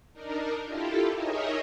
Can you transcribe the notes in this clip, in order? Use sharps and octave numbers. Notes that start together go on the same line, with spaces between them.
D4 D#4 A#4
E4 F4 G4 A4
D#4 G#4 A#4 C#5 D#5 E5